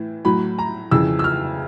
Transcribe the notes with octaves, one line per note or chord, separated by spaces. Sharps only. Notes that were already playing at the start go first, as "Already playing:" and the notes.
Already playing: A2 E3
A2 F#3 B5
A#5
F2 C#3 E3 E6
E6
F6